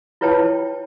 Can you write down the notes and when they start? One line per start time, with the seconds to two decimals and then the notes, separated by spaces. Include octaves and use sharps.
0.21 E4 F4 B4 C#5 G5 A5